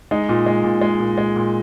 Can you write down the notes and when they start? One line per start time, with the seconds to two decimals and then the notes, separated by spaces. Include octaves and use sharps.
0.11 G#3 D#4
0.29 A#2
0.46 G#3
0.64 A#2
0.82 G#3
1.00 A#2
1.18 G#3
1.36 A#2